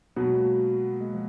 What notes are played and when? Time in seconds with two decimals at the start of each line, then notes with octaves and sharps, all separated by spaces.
0.16 B2 F#3 A#3 B3
0.27 G#3
0.39 A#3
0.94 A#3
1.01 G#3
1.14 F3